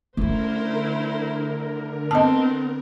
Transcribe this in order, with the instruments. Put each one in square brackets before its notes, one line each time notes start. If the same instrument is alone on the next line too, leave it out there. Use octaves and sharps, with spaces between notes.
[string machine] D3 A#4 [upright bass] A3 C#4 [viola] E4 C5
[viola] B3 C4 [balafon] D#5 A5